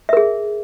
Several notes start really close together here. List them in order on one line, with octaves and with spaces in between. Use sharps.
E5 A#4 G#4